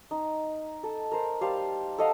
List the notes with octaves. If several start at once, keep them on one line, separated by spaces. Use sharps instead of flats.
D#4
A4
A#4 C5
G3 C5 F5 A5
A4 D#5 F5 F#5